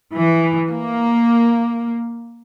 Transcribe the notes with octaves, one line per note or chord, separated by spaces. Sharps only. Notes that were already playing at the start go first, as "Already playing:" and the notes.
E3
A#3